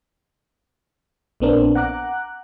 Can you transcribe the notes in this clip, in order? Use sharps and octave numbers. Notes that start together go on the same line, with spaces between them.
A#1 A#2 B3 C4 D4 A#4
F#5 A#5 D6 F#6